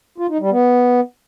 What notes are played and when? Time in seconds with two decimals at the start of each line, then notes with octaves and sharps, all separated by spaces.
0.18 F4
0.29 D#4
0.40 G3
0.51 B3